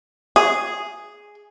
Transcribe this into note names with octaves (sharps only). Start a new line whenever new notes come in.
G#4